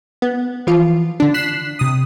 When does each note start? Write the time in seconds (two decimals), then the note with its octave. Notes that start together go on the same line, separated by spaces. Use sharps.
0.22 B3
0.67 E3 F3 F4
1.20 D3 D4
1.34 F#6 B6 C7 E7
1.79 C3 D#6